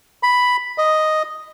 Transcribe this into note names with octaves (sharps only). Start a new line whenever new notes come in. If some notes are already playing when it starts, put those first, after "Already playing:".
B5
D#5